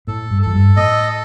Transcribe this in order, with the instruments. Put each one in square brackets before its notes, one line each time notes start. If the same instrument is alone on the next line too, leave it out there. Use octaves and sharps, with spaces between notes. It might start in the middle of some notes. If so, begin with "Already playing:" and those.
[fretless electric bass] A2 [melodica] A4
[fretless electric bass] G2
[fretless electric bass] F2 [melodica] A4
[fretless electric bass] G2
[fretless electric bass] A2 [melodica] D#5